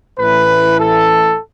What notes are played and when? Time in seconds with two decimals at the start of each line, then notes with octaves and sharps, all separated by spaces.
0.19 A1 A2 E3 B4
0.78 A4